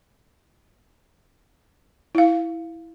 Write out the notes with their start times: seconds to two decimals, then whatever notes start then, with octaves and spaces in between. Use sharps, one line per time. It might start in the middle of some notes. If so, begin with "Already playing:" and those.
2.15 E4 F5